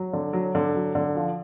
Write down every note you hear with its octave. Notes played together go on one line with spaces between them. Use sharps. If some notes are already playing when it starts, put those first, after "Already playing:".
Already playing: F#3
D3
F#3
D3
F#3
D3
F3